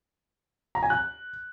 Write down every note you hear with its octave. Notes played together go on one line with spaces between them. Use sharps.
A#5
G#5
F#6